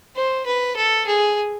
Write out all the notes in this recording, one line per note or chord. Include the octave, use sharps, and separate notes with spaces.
C5
B4
A4
G#4